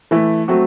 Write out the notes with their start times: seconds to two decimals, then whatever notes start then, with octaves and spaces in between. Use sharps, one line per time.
0.11 E3 A3 E4
0.48 F#3 A3 C4 F#4